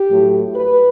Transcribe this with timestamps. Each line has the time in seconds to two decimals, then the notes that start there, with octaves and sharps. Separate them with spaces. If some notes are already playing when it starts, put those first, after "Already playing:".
Already playing: G4
0.10 A2 F#3 A3
0.56 B4